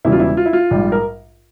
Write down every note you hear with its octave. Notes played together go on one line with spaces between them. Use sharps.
E1 E2 C#3 G3 E4
F4
E4
F4
E4
F4
A#1 G#2 G3
A#4